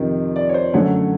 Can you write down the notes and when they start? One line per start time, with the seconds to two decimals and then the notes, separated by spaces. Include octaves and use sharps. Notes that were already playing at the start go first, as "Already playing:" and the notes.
Already playing: F2 C3 D#3
0.36 D5
0.49 C#5
0.54 C5
0.74 F#2 D3 F#3 A3 C#5